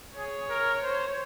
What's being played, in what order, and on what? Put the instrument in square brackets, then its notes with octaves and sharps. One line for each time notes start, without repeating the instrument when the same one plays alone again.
[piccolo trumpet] G#4 [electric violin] C#5
[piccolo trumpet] A#4
C5